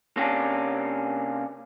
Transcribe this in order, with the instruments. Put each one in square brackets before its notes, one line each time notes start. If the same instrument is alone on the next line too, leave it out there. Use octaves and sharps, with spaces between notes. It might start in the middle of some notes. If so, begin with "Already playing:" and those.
[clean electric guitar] C3 A#3 C#4 D4